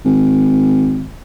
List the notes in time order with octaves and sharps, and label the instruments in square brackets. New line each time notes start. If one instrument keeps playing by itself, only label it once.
[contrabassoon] G#1